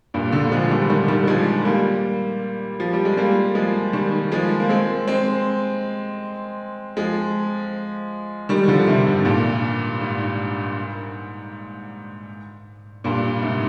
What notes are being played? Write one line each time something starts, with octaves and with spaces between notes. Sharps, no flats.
G2 A#2
A#2 D3
F3 G#3
D#3 G3
D#3 G3
D#3 G3
F3 G#3
G3 A#3
F3
G3
G#3
G3 A#3
F3 G#3
D#3 G3
F3 G#3
A#3
G#3 C4
G#3 C4
F3 G#3
D#3 G3
D3 F3
C3 D#3
G#2 C3
G2 A#2
G#2
G2 A#2
G#2 C3